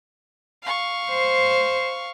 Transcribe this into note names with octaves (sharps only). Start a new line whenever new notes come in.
F5 C#6
C5